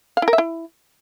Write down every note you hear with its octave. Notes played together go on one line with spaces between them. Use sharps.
F5
E4
A#4
E5
E4